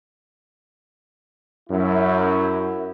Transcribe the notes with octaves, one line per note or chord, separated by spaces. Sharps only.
F#2 E4